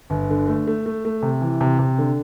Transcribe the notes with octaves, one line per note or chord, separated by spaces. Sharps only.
G1
D3
A3
A3
A3
A3
C3
E3
C3
C3
D3